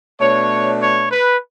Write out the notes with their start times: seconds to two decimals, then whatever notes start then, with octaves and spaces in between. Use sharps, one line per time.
0.20 B2 A3 D4 C#5
0.81 C#5
1.11 B4